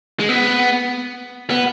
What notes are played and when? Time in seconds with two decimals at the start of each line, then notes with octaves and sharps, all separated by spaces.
0.20 G#3
0.29 B3
1.50 B3